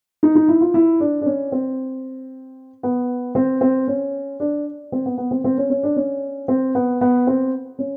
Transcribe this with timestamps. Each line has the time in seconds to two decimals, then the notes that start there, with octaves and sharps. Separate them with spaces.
0.23 D#4
0.35 D#4
0.48 E4
0.61 F4
0.74 E4
1.00 D4
1.21 D4
1.26 C#4
1.52 C4
2.83 B3
3.35 C4
3.61 C4
3.88 C#4
4.40 D4
4.92 C4
5.06 B3
5.18 B3
5.31 C4
5.44 C4
5.58 C#4
5.70 C#4
5.83 D4
5.96 C#4
6.48 C4
6.75 B3
7.01 B3
7.27 C4
7.79 C#4